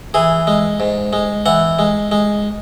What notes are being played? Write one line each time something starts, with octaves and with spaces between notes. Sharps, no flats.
E3 G#4
G#3
G#2
G#3
E3 F#5
G#3
G#3